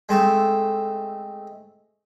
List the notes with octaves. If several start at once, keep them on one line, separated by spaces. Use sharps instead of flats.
G#3 A3 C4 A4